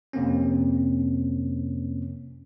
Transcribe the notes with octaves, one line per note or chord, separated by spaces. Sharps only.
F2 C3 A#3 C4 C#4